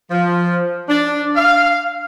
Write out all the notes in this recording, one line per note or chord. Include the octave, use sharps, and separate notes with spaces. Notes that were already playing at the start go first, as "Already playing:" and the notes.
F3
D4
F5